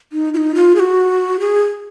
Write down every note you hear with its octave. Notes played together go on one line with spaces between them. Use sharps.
D#4
F4
D#4
F4
G#4
F#4
G#4